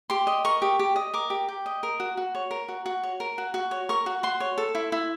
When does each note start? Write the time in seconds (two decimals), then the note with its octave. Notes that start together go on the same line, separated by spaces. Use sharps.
0.10 G4 C6
0.27 D#5
0.45 A#4 C#6
0.62 G4
0.79 G4
0.96 D#5
1.14 A#4 D6
1.30 G4
1.49 G4
1.66 D#5
1.83 A#4
2.00 F#4
2.17 F#4
2.35 C#5
2.51 A#4
2.68 F#4
2.86 F#4
3.03 C#5
3.20 A#4
3.38 F#4
3.54 F#4
3.71 C#5
3.89 A#4 C#6
4.06 F#4
4.23 F#4 C6
4.40 C#5
4.58 A4
4.75 E4
4.92 E4